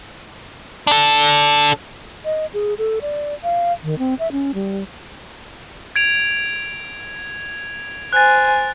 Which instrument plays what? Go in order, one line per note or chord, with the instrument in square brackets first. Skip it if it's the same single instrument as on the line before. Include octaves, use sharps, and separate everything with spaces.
[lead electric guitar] D4 A4
[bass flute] D#5
G#4
A4
D5
F5
D#3
C4
E5
C#4
G3
[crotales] G#6 D7 F7
[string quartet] C5 G#5 [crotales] F#6 A6